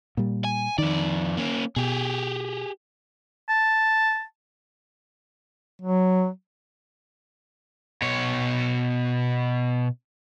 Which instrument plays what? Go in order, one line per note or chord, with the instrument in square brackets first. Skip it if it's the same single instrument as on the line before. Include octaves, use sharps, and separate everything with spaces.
[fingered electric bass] A#2 G3
[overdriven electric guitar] G#5
[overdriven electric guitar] F2 D5 [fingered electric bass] D#3
[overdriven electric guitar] A#3 C#4
[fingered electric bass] B2 [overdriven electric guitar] G4 G#4
[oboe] A5
[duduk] F#3
[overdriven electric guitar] B2 C#5